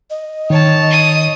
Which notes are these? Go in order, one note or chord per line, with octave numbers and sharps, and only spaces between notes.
D#5
D#3 C#5 A5
D#6